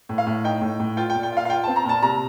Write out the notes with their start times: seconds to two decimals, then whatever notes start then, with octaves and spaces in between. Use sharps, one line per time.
0.09 A2
0.18 F5
0.27 A2
0.44 D#4 G5
0.61 A2
0.79 A2
0.97 F4 G5
1.10 G5
1.15 A#2
1.23 G5
1.32 F4 F5
1.45 F5
1.50 F4 G5
1.64 C4 A5
1.76 A#5
1.85 A#2 A5
2.02 C3 A#5